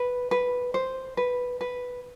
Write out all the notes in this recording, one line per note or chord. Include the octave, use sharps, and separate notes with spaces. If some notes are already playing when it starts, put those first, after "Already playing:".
Already playing: B4
B4
C5
B4
B4